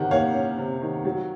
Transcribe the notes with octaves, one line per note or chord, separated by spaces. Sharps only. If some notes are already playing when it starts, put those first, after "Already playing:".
Already playing: C3 D#3 F#5
A#3 C#5 F5
C#4
C3
D#3
F#3